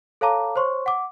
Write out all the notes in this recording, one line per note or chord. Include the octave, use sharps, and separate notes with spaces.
A4 C#5 F5 A5 A#5 D6
C5 C#5 C6 C#6
F#5 D6